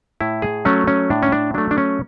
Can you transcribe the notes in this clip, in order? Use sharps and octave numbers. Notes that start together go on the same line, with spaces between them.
A2 E4
G#4
F#3 A3 C#4
C#4
A2 D4
C#4
D4
F#3 A3 D4
D4
C#4